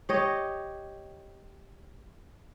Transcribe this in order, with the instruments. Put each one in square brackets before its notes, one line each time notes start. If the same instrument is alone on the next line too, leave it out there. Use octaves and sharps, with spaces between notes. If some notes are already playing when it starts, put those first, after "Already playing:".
[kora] G4 C#5 D#5